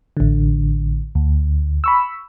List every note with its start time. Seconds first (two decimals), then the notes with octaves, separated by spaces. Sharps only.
0.17 A1 D3
1.15 D2
1.84 B5 C#6 E6